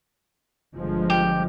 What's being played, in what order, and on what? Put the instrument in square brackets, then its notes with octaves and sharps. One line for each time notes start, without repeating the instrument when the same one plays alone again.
[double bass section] G1 F3 G#3
[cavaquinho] G4